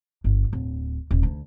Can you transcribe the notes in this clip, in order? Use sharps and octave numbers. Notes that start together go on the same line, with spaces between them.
G1
D1
D#1
D2